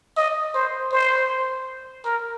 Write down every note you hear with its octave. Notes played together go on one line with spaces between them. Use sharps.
D#5
C5
C5
A#4